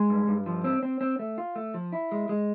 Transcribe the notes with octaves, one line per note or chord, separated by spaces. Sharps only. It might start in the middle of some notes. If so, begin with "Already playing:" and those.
Already playing: G#3
G2
G2
F3
C4
C4
C4
A3
F4
A3
F3
E4
G#3
G#3